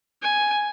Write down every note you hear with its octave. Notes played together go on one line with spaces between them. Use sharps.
G#5